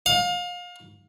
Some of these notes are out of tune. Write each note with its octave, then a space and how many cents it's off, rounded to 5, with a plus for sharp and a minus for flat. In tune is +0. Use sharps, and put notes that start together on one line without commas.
F5 +30